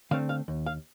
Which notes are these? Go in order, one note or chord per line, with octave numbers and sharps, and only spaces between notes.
D3 A3 C4 F5
F5
D#2
F5